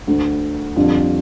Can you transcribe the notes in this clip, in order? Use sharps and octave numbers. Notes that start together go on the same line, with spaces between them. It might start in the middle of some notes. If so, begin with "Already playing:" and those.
D2 D3 A3
F2 D3 G3 D4 F4